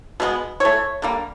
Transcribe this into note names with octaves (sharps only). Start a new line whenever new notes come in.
B2 G#3 B3
E3 A3 C#5
D3 G3 A#3